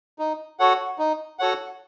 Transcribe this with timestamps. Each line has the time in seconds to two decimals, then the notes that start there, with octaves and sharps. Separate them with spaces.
0.19 D#4
0.59 F#4 A4 C#5 F#5
0.99 D#4
1.39 F#4 A4 C#5 F#5